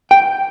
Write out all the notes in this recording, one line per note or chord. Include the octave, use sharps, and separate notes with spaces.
G5